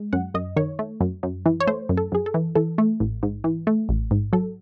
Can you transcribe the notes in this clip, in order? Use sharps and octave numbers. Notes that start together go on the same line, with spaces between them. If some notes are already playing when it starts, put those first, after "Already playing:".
Already playing: G#3
F#2 F#5
F#2 D#5
D#3 C#5
A3
F#2
F#2
E3
C#5
A3 C5
F#2
A4
F#2 G#4
A4
E3
E3 A4
A3
A1
G#2
E3
A3
A1
G#2
F#3 A4